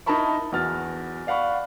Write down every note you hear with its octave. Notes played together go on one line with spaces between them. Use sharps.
D#4 E4 A#4 A5 B5 C#6
E2 F#4 F6 A6
D5 F5 F#5 B5 C#6